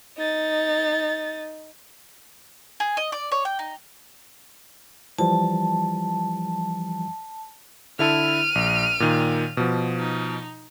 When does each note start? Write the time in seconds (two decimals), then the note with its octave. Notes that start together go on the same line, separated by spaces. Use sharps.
0.17 D#4 A6
2.80 G#4
2.97 D#5
3.12 D5
3.32 C#5
3.45 G5
3.59 D#4
5.19 E3 F3 G3 A5
7.99 D3 E4 A4 F6 D#7
8.55 A#1
9.00 A#2 D#3
9.57 B2 F3
9.99 D#4